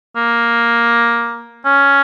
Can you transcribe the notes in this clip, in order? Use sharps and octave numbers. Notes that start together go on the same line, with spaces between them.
A#3
C#4